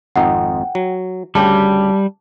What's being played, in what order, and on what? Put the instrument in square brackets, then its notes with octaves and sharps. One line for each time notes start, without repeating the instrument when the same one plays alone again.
[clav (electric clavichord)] G#1 F2 D#4 [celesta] F#5 G5
[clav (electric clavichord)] F#3
[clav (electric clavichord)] D2 C#3 G4 [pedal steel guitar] G3 [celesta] A5